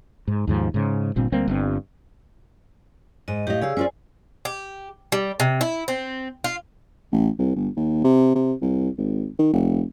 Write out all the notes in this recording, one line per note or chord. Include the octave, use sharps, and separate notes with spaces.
G#2
D#2 G#2 F3
G#2 C#3
G1 G2 A#2 C4
D2 G3 A#3 C4
G1 G2 C4
G#2 D#5
A2 G4 D#5 F5
C#3 G#4 D5 F5 E6
C#4 F4 C5 D5 G#5
G4
G3
C3
E4
C4
F4
A1
C2
G1
D#2
C3
C3
C2
G#1
D#3
F1